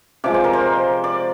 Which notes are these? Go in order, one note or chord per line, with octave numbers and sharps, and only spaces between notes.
C3 F3 G#3 D5
C5
A#4
C5
D5